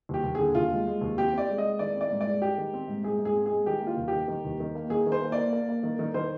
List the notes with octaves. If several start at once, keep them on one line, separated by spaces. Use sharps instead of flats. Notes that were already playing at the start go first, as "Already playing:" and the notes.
D#2 G4
D#2
D3 G#4
D#2 F4
G#3
G#3
D#2
C4 G4
C4 D5
G#3
D#5
G#3
D#3 D5
C4 D5
G#2
D5
G#3
G#3 G4
D#3
C4
G#2
G#2 G#4
G#2
G#4
C4
G#4
G#3
D#3 G4
A#3
F4
D#2
D#3 G4
D#3
D#2
D#3
A#3
D#3 G#4
D#3
C5
A#3
D5
A#3
A#3
A#3
D#3
D#3
D#3 C5